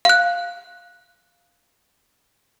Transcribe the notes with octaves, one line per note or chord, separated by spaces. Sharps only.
F5 F#6